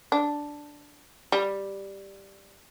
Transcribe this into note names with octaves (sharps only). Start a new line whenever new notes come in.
D4
G3